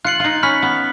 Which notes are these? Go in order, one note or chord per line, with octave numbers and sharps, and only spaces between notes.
F4 F#6 C#7 F#7
D#4 F4
C#4 B5 F6 B6
B3